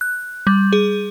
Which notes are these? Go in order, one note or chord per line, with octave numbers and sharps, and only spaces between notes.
F#6
G3
G#4